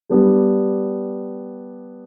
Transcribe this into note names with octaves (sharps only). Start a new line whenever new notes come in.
G3 B3 D4 G4